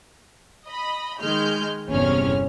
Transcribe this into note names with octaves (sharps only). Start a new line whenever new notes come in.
D#5 B5
D#3 G#3 F6 G6
G1 E2 C3 C#4 F6